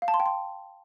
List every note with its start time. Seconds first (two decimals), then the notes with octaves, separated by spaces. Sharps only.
0.02 F5
0.08 A5
0.14 C6
0.20 G5
0.26 C6